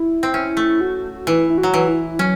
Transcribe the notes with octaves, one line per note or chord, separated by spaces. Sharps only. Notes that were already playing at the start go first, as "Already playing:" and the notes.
Already playing: E4
C4
C#4 E4
A3
F#4
E3 E4
E4
F#4
F#3
E3
E4
F#3 C#4